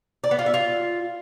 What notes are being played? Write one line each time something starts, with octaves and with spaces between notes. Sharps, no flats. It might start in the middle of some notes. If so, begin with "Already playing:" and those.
D5
B3
F4
E5
F4